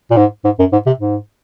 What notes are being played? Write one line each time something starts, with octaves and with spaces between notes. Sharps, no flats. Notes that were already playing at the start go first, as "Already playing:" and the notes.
A#2
G#2
G#2
F#2
G#2
C3
G#2